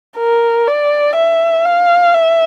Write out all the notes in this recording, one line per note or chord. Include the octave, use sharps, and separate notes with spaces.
A#4
D5
E5
F5
E5